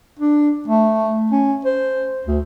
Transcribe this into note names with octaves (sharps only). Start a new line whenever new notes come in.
D4
A3
C#4
C5
D2